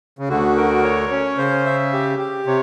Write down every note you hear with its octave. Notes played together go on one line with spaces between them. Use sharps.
C#3
D2 D3 F#4
A#4
C#5
C#4
C#3 C5
E5
G4
G4
C3 C#5